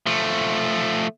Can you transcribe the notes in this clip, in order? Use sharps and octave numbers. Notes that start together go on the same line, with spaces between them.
F3 A3